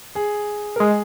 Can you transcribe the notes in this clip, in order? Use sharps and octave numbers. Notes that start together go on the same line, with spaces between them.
G#4
A#4
G#3 G#4